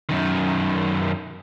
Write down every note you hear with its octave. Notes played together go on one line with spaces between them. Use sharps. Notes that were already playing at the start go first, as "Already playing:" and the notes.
F#2 D#3